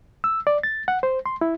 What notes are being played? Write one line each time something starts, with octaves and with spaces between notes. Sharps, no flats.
E6
D5
A6
F#5
C5
C6
E4